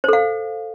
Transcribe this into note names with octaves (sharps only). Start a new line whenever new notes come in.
A4 C5 F5